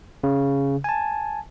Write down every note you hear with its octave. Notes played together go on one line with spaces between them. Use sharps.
C#3
G#5 A5